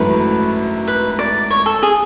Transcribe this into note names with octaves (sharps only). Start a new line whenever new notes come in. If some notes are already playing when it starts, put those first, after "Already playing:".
Already playing: G#1 F#2 E3 A3 B4
B4
D5
C#5
A4
G#4